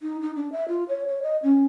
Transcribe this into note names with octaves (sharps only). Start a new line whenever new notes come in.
D#4
D#4
D4
E5
F4
C#5
C#5
D#5
C#4